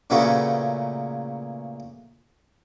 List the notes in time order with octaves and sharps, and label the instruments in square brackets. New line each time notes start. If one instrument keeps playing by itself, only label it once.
[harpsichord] A#2 C#3 F#3 A3 B3 C#4